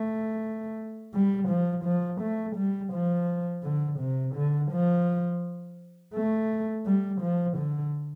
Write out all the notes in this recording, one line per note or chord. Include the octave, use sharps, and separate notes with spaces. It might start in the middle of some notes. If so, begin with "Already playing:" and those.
Already playing: A3
G3
F3
F3
A3
G3
F3
D3
C3
D3
F3
A3
G3
F3
D3